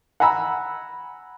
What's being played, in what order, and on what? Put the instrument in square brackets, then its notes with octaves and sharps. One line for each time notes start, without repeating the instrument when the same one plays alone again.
[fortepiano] F#5 G#5 A#5 B5 E6